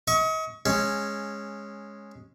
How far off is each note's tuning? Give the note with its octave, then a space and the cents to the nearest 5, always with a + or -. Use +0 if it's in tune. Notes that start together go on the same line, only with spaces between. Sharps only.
D#5 +40 C#6 +10
G#3 +0 C#4 -10